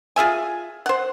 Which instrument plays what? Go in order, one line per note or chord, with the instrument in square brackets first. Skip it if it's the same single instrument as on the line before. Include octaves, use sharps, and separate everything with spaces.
[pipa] F4 G#4 E5 G#5
C5 F#5